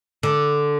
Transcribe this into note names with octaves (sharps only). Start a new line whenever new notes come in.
D3